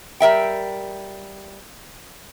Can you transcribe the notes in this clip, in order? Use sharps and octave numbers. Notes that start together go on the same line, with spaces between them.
G3 A#4 E5 G5